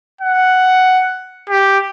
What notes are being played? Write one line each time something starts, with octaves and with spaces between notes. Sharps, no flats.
F#5
G4